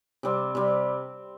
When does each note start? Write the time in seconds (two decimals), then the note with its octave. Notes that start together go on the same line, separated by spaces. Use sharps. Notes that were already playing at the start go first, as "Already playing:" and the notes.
0.23 C3 G3 C4
0.55 C3 G3 C4